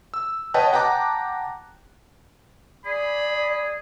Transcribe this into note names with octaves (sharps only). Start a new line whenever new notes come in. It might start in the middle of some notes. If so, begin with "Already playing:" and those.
E6
B4 C#5 D#5 F#5 G5 A5
F#5 G5 A5 A#5 D6 F#6
G#4 D5 B5